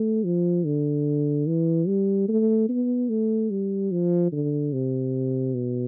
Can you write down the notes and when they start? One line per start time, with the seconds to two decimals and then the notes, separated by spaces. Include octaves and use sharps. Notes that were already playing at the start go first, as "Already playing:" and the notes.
Already playing: A3
0.24 F3
0.65 D3
1.47 E3
1.88 G3
2.28 A3
2.69 B3
3.09 A3
3.50 G3
3.91 F3
4.32 D3
4.73 C3
5.54 B2